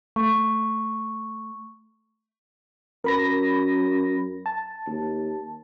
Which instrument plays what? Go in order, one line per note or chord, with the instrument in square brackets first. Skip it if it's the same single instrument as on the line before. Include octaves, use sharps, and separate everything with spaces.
[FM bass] A3 [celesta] C#6
[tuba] F#2 [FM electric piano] A#4 B5 A#6
[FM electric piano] A5
[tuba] D#2